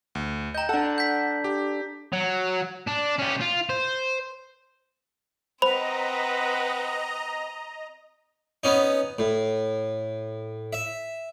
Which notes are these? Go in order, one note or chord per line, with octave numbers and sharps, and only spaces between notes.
D2
D#5 G5 A#5 G6
D4 A4 F#5
G6 B6
G4
F#3
D4
C#4 G4
F4
C5
C4 B4 C5 D#5 F#5 A#5 B5 F7
B3 C#4 D#4
A2
E5